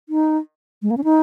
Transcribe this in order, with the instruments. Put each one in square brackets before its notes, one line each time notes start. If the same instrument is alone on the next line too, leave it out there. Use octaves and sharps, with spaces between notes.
[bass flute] D#4
G#3
A#3
C#4
D#4